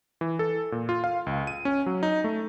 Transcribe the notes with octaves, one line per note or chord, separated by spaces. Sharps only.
E3
A4
A#2
F4
F5
C#2
D#7
C#4
F#3
D#4
A3